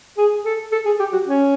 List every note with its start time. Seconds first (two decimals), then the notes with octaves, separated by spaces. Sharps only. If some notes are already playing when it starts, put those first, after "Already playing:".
0.18 G#4
0.45 A4
0.72 A4
0.86 G#4
1.00 G4
1.13 F#4
1.27 C#4